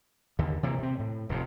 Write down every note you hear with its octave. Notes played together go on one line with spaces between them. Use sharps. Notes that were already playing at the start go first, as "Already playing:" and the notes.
D#2 D3
C3 E3 A#3
C3 C4
A2
F1 D#2 C3